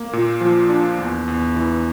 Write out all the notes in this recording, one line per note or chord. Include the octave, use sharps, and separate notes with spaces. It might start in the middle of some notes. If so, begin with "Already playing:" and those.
Already playing: A#3
A#2
F3
D4
E2
E2
E3